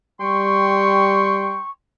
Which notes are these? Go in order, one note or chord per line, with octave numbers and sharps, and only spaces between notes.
G3 G5 C6 C#6